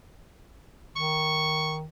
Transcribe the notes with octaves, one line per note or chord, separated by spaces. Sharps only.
D#3 C#6